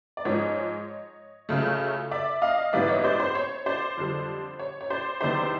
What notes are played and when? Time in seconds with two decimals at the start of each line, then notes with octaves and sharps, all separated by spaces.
0.17 D5
0.25 G#2 F3 G#3 C#5 D#5
1.49 C#2 C#3 F#3 A3
2.11 D5 E5
2.42 D#5 F5
2.73 G#2 E3 G3 B3 D5 E5
2.88 C#5 D#5
3.04 C5 D5
3.20 C5
3.35 C#5
3.66 C5 D5
3.97 F2 D3 G3
4.59 C#5
4.81 C#5
4.90 C5 D5
5.21 E2 C3 D#3 C5 D5